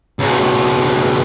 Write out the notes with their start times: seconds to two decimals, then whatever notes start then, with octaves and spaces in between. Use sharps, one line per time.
0.19 C#2 B2